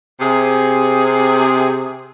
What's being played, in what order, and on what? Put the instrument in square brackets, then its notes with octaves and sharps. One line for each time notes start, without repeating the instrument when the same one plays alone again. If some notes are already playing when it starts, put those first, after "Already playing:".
[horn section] C3 G#4